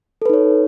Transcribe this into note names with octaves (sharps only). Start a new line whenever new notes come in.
D#4 A4 B4 C#5